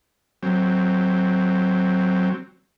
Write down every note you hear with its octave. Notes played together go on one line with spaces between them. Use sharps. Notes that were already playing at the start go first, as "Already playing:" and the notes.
F#3 C4